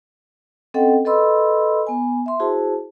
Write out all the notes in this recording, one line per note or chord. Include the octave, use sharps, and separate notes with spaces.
C4 C#4 A4 D#5 F#5 G5
A4 B4 D#5 B5 C6 E6
B3 G#5
E5 C6
E4 F#4 G#4 C5 A5